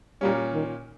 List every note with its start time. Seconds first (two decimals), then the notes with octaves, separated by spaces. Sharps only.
0.21 A#2 G3 A#3 C#4
0.53 D#3